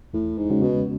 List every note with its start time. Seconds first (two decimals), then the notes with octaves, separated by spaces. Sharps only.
0.13 E2 A2
0.38 G#2
0.50 C#3 G#3 C#4 F#4
0.62 B2